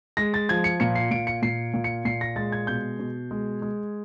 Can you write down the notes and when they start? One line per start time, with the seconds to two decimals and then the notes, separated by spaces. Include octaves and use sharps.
0.17 G#3 A#6
0.34 A6
0.49 F3 G#6
0.64 C#7
0.80 A#2 C#7
0.95 C7
1.11 A#2 D7
1.27 C#7
1.42 A#2 C7
1.74 A#2
1.84 C#7
2.05 A#2 C7
2.21 A#6
2.36 G#3 A6
2.52 G#6
2.67 B2 G6
2.99 B2
3.31 G#3
3.62 G#3